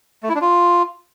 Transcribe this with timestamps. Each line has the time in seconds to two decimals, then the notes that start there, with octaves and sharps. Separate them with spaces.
0.23 A3
0.29 E4
0.35 D4
0.41 F4